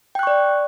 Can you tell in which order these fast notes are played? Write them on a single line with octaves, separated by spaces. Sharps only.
G5 F#6 C#6 D5